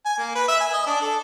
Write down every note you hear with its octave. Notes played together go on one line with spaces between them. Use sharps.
G#5
A#3
B4
E5
G#5
D#5
D4
A4